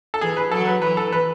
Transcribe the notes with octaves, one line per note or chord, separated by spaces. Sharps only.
A4
E3 G#4
B4
F#3 A4
B4
E3 B4
A4
B4